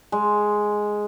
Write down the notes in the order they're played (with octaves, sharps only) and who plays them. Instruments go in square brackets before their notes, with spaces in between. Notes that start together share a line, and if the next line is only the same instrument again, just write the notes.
[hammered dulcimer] G#3